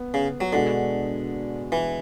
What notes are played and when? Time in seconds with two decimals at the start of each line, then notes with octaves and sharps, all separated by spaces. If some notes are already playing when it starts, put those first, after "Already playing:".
Already playing: B3
0.14 C#3
0.41 F#3
0.53 B2 D3 G#3 D4 F#4
1.72 E3